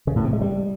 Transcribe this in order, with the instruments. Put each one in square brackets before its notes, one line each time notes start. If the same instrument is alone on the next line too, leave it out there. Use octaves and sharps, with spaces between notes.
[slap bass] C#3
A2
C3
G#3
G3